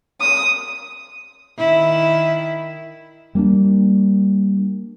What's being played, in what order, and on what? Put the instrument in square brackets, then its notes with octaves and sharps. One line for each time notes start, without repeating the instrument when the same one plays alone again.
[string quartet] D#6
[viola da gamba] D#3 E4
[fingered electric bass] G3 A#3 C#4 D4